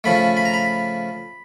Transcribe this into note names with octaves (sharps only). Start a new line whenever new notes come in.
C#3 F3 A3 B5
B5
A#5
B5